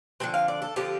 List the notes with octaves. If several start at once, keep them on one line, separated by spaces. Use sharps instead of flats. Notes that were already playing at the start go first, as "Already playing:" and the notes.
D3 F3 C4 G5
F5
D5
A4
D3 F3 C4 G4